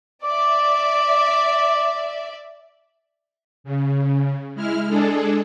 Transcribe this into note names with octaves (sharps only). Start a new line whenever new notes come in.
D5 E5 D6
C#3
G#3 E4 F6
G#3 D4 G#4 A4